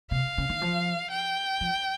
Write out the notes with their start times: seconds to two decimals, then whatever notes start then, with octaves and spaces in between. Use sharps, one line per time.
0.11 C3 F5
0.38 C#3
0.49 D#3
0.62 F3
1.11 G5
1.61 F3